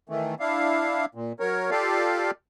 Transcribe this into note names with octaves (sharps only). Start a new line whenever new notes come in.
D#3 E3 A3
D4 E4 F5
A#2
F#3 A#4 C#5
F4 G4 A4 D5 F5